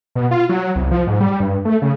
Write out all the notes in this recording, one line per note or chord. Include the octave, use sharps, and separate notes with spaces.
B2
F4
F#3
C2
F3
G#2
G3
G2
A3
C#3